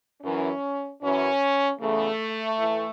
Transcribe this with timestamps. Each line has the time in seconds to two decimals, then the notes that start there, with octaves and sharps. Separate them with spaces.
0.22 F#2 E3 C#4
1.01 F#2 E3 C#4
1.79 E2 C#3 E3 A3
2.58 A2 E3